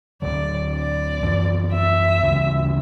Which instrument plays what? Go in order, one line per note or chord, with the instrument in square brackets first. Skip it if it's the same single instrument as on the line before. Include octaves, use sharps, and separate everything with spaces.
[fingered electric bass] D2 D3 F#3 [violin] D5
[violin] D5
[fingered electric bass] F#2 E3 B3
[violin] E5
[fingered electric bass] D2 C#3 E3